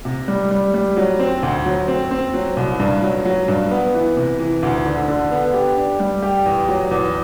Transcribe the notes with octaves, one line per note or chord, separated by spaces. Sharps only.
C3
G3
G3
G3
F#3
C4
D2
F#3
C4
C4
F#3
C2
G2
F#3
F#3
G2
B3
E3
C3
E3
D2
D3
D3
B3
G4
D4
G3
G4
E2
F#3
E2